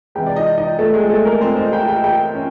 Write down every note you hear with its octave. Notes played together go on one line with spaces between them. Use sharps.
C3 E3 G#3 G4 G5
D5
D#4 D#5
D#4 D#5
A3 A4
G#3 G#4
A3 A4
A#3 A#4
C4 C5
D#4 D#5
G4 G5
G4 G5
G4 G5
C#4